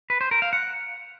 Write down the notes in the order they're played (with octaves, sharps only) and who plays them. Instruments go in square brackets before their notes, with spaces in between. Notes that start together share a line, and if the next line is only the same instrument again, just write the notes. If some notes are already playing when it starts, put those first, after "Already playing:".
[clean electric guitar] B4
C5
A#4
F5
F#5